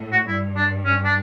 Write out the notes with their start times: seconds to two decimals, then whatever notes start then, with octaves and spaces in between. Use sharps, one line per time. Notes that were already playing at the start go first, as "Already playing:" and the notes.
Already playing: A2
0.12 F#4
0.27 G2 E4
0.57 D4
0.86 C#4
1.05 D4